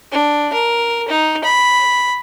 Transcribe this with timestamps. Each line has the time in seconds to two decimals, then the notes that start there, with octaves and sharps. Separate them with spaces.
0.12 D4
0.53 A#4
1.08 D#4
1.44 B5